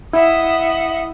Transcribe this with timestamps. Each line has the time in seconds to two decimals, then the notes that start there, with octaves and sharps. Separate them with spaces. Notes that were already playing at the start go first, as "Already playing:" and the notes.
0.13 E4 D#5 E5 F#5